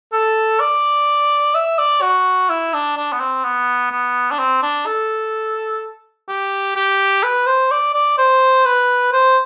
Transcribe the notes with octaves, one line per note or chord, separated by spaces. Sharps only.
A4
D5
E5
D5
F#4
E4
D4
D4
B3
C4
B3
B3
D4
C4
D4
A4
G4
G4
B4
C5
D5
D5
C5
B4
C5